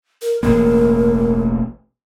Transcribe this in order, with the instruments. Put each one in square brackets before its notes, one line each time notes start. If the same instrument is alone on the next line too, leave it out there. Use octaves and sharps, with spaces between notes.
[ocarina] A#4
[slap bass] E1 A1 A#3 [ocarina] A#4